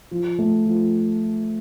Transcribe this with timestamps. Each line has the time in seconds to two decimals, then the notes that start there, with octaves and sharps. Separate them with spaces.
0.11 F3
0.39 A3
0.67 F3